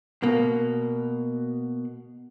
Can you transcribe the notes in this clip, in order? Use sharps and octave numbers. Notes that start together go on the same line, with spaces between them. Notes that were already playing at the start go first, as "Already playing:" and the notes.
B2 A#3